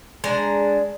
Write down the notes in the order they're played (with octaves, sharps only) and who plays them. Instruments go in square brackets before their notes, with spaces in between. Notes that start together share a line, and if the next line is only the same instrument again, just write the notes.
[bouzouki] G#3 D4 A#5